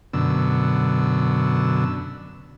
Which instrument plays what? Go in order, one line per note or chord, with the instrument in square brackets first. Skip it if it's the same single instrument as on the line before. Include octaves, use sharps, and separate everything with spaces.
[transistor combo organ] F#2 B2 D3 E6